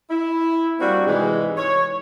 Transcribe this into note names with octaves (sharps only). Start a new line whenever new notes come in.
E4
G3 A#3 C4 D4 E4 F#4
G#2 C3 E3 G#3
C#5